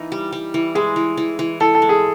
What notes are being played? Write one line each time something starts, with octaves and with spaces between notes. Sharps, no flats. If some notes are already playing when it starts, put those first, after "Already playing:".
Already playing: E3 A#3 D#4
G3
G3
E3
G#3 G#4
E3
E3
E3
E3 A4
A4
G#3
G#4